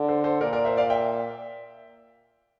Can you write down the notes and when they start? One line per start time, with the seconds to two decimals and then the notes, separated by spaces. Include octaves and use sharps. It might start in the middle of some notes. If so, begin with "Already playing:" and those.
Already playing: D3
0.08 A4 C5
0.24 A4 C5
0.41 A#2 A#4 D5
0.53 A#4 D5
0.65 C5 E5
0.77 D5 F5
0.90 E5 G5